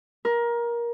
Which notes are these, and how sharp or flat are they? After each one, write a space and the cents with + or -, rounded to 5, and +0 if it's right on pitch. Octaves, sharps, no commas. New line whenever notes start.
A#4 +20